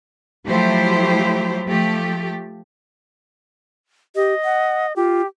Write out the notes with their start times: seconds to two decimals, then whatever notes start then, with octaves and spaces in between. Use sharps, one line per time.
0.47 F3 F#3 A3 E4 G4 C5
1.67 F3 A3 G4
4.15 G4 D#5
4.44 F#5
4.96 F4 G4